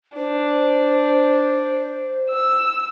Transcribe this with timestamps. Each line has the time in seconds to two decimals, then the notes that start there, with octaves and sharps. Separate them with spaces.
0.17 D4 C5
2.30 E6